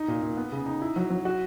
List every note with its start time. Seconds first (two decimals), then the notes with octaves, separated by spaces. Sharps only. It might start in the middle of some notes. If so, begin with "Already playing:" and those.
Already playing: D#4
0.08 A#2
0.22 A#2
0.37 B3
0.52 C#3
0.66 D#4
0.82 E4
0.96 F#3
1.10 F#3
1.25 F#4